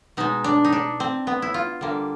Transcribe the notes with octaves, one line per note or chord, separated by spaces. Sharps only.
B2 G#3 D#4
D4
D#4
D4
C4
B3
E4
F4
D3 G3 A#3